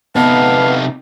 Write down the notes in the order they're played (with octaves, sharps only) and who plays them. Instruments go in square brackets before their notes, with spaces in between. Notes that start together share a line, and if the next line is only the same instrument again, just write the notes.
[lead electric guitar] C3 D#4 [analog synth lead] B3 [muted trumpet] F5 [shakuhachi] A5